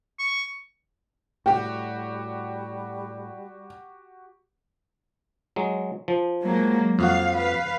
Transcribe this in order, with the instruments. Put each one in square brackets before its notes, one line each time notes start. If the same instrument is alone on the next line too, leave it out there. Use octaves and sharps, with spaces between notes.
[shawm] C#6
[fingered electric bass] A2 [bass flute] G3 [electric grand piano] F#4 G4 [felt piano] G5
[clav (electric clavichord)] F#3 G#3
F3
[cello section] F#3 G#3 A#3
[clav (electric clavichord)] F2 F#4 [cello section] F3 F5
[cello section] B4 F5